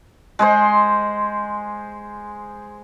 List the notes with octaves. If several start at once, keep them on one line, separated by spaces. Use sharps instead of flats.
G#3 G#4 C5